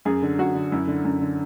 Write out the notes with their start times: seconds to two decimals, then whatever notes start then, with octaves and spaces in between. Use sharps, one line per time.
0.05 F#2 G#4
0.22 D3
0.38 F#2 F#4
0.54 D3
0.72 F#2 E4
0.87 D3
1.04 F#2
1.21 D3